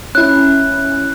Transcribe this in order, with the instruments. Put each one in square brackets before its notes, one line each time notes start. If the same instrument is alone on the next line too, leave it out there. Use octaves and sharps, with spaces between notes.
[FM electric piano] C#4 E4 [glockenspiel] F#6